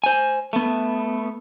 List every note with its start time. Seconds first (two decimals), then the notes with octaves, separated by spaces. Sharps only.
0.04 C5 G#5
0.53 A3 B3